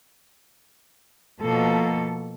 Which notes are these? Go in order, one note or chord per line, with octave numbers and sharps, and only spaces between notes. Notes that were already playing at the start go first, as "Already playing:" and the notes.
B2 F3 A#3 A4